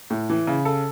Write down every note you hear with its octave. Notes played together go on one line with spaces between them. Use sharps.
A2
E3
C#3
A4